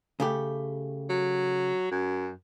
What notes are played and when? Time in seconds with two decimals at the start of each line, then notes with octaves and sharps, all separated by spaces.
0.20 C#3 A3 G4
1.10 F#3
1.91 F#2